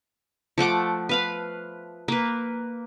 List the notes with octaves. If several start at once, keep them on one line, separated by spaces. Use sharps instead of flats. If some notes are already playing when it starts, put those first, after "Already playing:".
F3 A3 F#5 D6
B4 F5 B5
A#3 B4